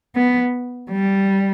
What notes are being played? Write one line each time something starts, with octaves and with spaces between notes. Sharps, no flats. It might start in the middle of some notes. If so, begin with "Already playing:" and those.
B3
G3